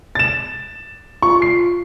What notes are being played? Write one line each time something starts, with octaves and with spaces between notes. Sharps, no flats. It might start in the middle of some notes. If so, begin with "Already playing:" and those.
A6 E7
F4 C#6
C7